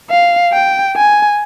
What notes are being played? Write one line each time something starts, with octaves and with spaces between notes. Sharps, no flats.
F5
G5
G#5